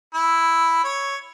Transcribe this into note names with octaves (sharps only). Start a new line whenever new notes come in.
E4
C#5